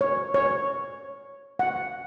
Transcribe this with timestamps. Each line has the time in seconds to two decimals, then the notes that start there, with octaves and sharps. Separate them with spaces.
0.01 C#5
0.34 C#5
1.59 F#5